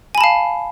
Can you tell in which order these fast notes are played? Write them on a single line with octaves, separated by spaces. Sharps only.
G#5 B5 A5 F5